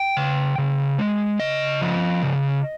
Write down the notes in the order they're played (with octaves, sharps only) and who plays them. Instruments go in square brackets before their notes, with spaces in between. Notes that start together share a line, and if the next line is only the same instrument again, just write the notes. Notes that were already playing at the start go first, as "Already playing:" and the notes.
Already playing: [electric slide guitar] G5
C#3
C#3
G#3
C#3 D#5
F3
C#3